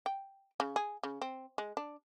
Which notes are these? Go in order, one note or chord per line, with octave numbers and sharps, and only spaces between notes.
G5
C#3
G#4
C#3
C4
G#3
D4